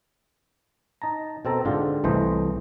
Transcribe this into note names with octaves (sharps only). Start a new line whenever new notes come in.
D#4 A5 A#5
B2 C4 A4 A#5
G#2 D3 F4 G4
C2 E3 A3 C5 D#5